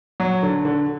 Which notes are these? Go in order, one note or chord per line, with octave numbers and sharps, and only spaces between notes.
F#3
D3
D3